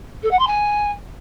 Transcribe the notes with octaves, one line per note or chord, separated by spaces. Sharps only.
A4
F#5
C6
G#5